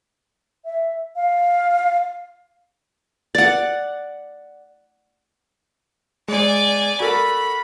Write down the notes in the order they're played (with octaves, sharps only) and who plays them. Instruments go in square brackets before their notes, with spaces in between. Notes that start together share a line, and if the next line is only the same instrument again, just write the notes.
[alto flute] E5
F5
[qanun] D5 F#5
[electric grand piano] G#3 [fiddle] D5 G#5
[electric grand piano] F#4 A4 A#4 [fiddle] B5